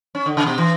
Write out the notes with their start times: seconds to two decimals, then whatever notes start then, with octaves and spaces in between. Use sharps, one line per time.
0.15 C#4
0.26 D3
0.37 C#3
0.46 B2
0.58 E3